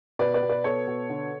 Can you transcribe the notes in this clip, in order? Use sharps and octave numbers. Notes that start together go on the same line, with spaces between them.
B2 B4 D5
B4 D5
B2
B4 D5
B3 A4 C#5
B2
D3